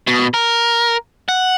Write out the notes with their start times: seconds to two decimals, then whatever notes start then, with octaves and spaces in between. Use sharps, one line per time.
0.07 B2
0.34 A#4
1.29 F#5